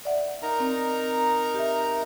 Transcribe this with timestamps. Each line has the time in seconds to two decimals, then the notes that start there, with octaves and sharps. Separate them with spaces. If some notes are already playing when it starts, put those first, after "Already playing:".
0.05 D5 E5 F#5
0.43 D#4 A#4 A#5
0.60 C4
1.54 G4 E5